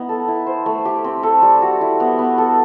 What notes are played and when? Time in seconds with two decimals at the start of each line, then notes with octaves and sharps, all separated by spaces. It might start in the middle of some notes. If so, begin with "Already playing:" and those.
Already playing: B3 D#4 E4 D#5
0.09 A4
0.28 E4
0.47 C5
0.66 A3
0.85 G4
1.04 C4
1.23 A4
1.42 G3
1.62 F#4
1.81 E4
2.00 B3
2.19 B3
2.38 A4